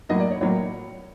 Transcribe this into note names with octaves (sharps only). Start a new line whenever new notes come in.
A2 F#3 A#3 D#5
D5
C#5
A2 F#3 A#3 C#5